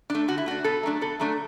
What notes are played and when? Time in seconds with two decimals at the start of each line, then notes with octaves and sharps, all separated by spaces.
0.10 A3 D4
0.28 D3 F#4
0.38 E4
0.46 A3 D4 F#4
0.64 B2 A4
0.83 F#3 A3 D4
1.01 B2 A4
1.20 F#3 A3 D4